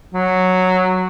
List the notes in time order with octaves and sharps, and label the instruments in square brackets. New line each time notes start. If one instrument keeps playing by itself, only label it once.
[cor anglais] F#3